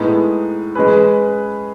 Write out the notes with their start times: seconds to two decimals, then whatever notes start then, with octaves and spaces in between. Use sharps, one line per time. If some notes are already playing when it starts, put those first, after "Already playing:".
Already playing: A2 G#3 B3 D#4
0.75 G#3 C#4 G#4 B4